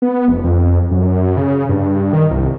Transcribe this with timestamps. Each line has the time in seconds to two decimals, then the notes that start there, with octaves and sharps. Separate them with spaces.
0.02 B3
0.28 F1
0.44 F2
0.91 F#2
1.37 C#3
1.69 G2
2.13 D#3
2.31 C2